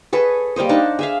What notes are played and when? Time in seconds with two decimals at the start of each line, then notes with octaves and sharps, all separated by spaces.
0.13 G#4 A4 B4 C#5
0.56 G3 A#3 C5 D#5
0.69 D4 D#4 F#5 A5
0.99 G#4 E5 F5